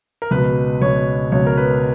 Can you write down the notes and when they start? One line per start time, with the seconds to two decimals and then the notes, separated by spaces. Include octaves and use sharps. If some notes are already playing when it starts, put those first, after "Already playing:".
0.22 A#4
0.31 C#2 B2 B4
0.81 C#2 B2 C#5
1.32 C#2 B2 C#5
1.46 A#4
1.57 B4